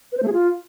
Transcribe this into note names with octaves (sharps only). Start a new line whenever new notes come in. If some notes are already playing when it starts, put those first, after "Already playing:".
B4
C5
A3
G#4
F4